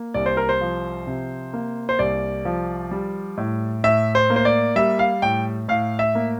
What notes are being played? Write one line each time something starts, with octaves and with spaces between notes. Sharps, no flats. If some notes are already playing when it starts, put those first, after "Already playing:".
Already playing: A#3
C2 D5
C5
A#4
C5
F3
C3
A#3
C5
C2 D5
F3
G3
A2
A2 E5
C5
A#3
C5
D5
G3 E5
F5
A2 G5
A2 F5
E5
A#3